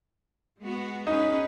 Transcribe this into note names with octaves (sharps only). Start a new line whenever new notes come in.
G#3 B3 F#4
C#4 D#4 G#4 B4